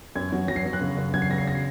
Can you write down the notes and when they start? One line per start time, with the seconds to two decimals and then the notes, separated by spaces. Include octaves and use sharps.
0.15 F#2 G#6
0.32 F#3
0.48 F#3 A#6
0.56 C7
0.65 F#3
0.73 F#6
0.81 C#3
0.97 F#2
1.14 F#3 G#6
1.22 C7
1.30 C#3 A#6
1.38 C7
1.47 A#6
1.55 C7